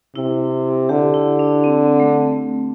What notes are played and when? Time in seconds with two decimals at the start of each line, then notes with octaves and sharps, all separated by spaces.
0.16 C3 E4
0.89 D3 G4
1.14 E4
1.39 D4
1.64 C4
2.00 A3